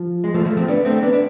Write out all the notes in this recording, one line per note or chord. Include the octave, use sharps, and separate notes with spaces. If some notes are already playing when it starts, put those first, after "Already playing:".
Already playing: F3
G#3
F3 A3
F3 A3
A3 C4
B3 D4
A3 C4
B3 D4
D4